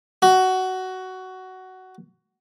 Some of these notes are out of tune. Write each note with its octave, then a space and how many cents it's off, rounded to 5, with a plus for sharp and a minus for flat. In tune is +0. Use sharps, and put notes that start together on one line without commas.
F#4 +15